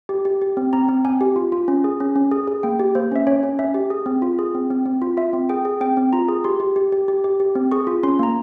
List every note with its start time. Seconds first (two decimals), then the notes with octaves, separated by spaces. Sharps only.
0.09 G4
0.25 G4
0.42 G4
0.57 C4
0.73 C4 A#5
0.89 C4
1.05 C4 G#5
1.21 G4
1.36 F4
1.52 F4
1.68 C#4
1.84 G#4
2.00 C#4
2.16 C#4
2.31 G#4
2.48 G#4
2.63 A#3 G5
2.80 G4
2.95 A#3 C5
3.12 C#4 E5
3.27 C#4 C#5
3.43 C#4
3.59 C#4 E5
3.74 G4
3.90 G#4
4.06 C4
4.22 F4
4.39 G#4
4.55 C4
4.71 C4
4.86 C4
5.02 F4
5.17 F4 E5
5.33 C4
5.49 G#4 G5
5.65 G#4
5.80 C4 G5
5.97 C4
6.13 F4 A#5
6.28 G#4
6.44 G4 C6
6.60 G4
6.76 G4
6.92 G4
7.08 G4
7.24 G4
7.40 G4
7.55 C4
7.71 G#4 C#6
7.87 F4
8.03 C#4 C6
8.19 A#3 A#5